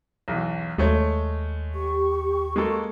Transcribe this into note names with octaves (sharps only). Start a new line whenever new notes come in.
B1 E2
D#2 G#3 A3 C#5
G4 C#6
G#3 A#3 A4